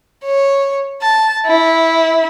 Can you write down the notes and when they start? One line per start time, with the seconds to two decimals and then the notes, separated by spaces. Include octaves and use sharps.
0.25 C#5
1.02 A5
1.46 E4